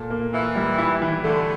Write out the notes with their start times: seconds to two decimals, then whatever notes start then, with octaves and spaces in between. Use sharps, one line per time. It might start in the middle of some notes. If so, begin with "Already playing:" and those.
Already playing: A#2 A4
0.10 A#3
0.33 E3 F4
0.55 G3
0.78 E4
1.02 E3
1.23 D3 A3